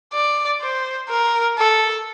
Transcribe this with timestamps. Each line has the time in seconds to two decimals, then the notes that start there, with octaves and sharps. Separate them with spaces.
0.13 D5
0.61 C5
1.10 A#4
1.58 A4